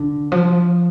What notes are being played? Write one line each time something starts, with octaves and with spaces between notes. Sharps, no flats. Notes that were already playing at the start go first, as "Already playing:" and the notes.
Already playing: D3
F3